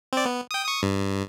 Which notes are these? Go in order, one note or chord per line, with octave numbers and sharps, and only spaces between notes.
C4 D5
B3
G5 D#6
C#6 D#6
G2